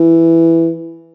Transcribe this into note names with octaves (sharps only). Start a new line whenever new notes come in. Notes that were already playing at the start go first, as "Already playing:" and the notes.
Already playing: E3